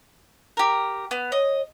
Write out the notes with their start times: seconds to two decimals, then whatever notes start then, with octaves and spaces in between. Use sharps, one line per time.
0.57 G4 A#4
1.11 B3
1.32 C#5 D#5